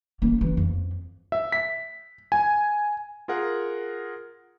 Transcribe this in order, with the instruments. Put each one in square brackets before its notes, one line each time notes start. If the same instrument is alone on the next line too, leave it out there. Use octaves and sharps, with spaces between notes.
[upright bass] A#3 C#4
E3
F2
[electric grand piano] E5
B6
G#5
F4 G#4 A#4 F#5